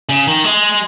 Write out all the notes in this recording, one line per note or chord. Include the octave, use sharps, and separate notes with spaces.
C#3
D#3
G#3